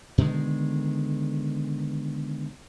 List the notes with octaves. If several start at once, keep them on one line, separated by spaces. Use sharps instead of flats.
B2 D3 D#3 G#3